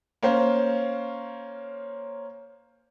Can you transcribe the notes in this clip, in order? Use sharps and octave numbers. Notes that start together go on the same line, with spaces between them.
A#3 C#4 C5